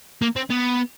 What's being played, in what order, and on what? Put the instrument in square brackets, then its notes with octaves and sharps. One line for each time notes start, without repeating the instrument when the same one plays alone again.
[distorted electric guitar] A#3
C4
B3